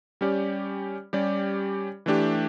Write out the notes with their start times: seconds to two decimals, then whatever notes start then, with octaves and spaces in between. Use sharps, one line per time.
0.21 G3 C#4 G4 D5
1.13 G3 C#4 G4 D5
2.06 E3 A3 D4 G4